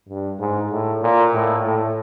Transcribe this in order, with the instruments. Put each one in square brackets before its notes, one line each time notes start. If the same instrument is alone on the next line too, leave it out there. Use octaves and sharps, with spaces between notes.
[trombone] G2
G#2
A2
A#2
A2
A2